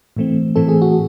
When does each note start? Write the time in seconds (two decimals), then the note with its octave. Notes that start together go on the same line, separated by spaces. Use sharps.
0.17 A2 E3 A3 C4
0.56 A2 E3 A3 C4 A4
0.69 G#4
0.82 F#4